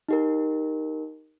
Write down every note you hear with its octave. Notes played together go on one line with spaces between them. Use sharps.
D#4 G4 A#4